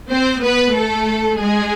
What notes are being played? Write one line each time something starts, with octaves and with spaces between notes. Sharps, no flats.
C4 C5
B3 B4
A3 A4
G#3 G#4